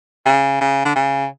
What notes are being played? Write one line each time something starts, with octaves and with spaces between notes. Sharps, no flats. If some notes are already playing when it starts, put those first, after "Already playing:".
C#3
C#3
D3
C#3